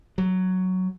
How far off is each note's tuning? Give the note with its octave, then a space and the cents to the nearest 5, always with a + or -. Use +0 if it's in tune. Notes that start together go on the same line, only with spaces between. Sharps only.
F#3 +5